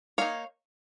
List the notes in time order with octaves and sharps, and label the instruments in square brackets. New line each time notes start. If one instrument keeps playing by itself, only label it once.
[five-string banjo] A#3 D#4 C#5 F5